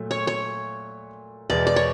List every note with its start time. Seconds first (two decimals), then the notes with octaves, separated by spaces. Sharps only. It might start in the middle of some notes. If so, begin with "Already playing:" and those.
Already playing: A#2 F#3 A3
0.11 C#5
0.27 C#5
1.50 E2 B2 G#3 D5
1.67 D5
1.76 C#5